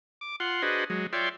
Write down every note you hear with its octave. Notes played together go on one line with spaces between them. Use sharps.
D6
F4 F#5 C6
D4 F#4 G#4 B4 C5 D#5
F#3 G#3
F4 C#5 D5 E5 G5 C6